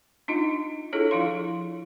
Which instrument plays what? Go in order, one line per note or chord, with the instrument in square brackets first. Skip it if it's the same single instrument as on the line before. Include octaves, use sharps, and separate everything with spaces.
[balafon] D4 D#4 F4 D#5
D4 E4 F4 G#4 A4 C#5
F3 E4 F4 F5 C6